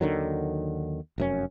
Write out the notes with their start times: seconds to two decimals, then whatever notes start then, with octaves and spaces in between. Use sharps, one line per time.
0.01 D#2 D3 D#3 F#3
1.18 F1 F#2 C#4